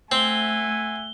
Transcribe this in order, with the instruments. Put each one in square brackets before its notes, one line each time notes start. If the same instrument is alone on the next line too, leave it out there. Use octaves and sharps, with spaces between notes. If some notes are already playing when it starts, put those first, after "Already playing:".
[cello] A3 [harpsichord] C4 [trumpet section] E5 F#5 G#5 [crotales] G7